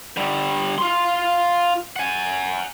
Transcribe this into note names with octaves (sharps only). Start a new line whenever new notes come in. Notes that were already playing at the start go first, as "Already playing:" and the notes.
D3 G3
F4 C6
F#5 G#5